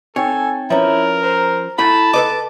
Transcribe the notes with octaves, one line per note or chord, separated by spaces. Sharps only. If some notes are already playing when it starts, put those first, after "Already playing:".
C4 D#4 A4 C#5 G5 G#5
F3 C#4 E4 A#4 B4 C#5 A#5
C5 A#5
A3 E4 F#5 A5 B5
A4 B4 D#5 D6